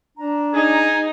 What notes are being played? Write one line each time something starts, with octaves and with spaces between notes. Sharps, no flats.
D4 A#5
D#4 G#4